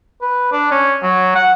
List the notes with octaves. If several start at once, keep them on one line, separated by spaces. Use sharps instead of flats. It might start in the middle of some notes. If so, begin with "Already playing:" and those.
B4
D4
C#4
F#3
F#5